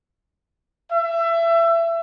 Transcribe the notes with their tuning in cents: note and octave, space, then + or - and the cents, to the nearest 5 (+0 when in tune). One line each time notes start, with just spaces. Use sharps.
E5 +25